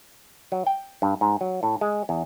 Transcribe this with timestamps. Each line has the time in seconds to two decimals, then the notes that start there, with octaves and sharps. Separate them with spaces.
0.52 F#3
0.67 G5
1.02 G2
1.21 G#2
1.41 F#3
1.63 A2
1.81 G#3
2.09 E2